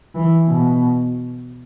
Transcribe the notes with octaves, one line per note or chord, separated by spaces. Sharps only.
E3
B2